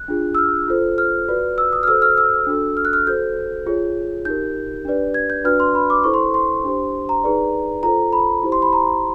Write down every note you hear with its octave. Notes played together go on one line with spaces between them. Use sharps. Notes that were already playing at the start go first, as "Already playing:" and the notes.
Already playing: F#6
D4 F4 G#4
E6
F6
F4 A4 C5
F6
F#4 B4 D5
E6
D#6
F6
F#4 A4 C5 E6
F6
E6
D4 F#4 A4
F6
F#6
F6
F#4 A4 C5 G6
F4 G#4 C#5
D#4 G4 A#4 G6
D4 G4 B4 D5
G#6
G6
D4 F#4 B4 D5 F6
C6
B5
D6
E4 A4 C5 C#6
C6
C6
D4 G4 C5
A#5
D#4 G#4 B4 D5
F4 A4 C5 A#5
B5
E4 G4 C5
C6
B5
A#5